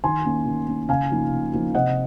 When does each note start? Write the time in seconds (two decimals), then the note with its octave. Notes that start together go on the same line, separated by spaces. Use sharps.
0.04 D#3 G#5 C6
0.25 A#3 C#4
0.46 D#3
0.67 A#3 C#4
0.89 C#3 F5 G#5
1.10 F3 A#3 D#4
1.31 C#3
1.53 F3 A#3 D#4
1.74 C3 D#5 F#5